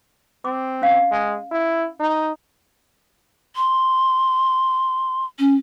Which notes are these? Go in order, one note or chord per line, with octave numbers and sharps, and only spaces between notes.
C4 D6
C#4 F5
G#3
E4
D#4
C6
C#4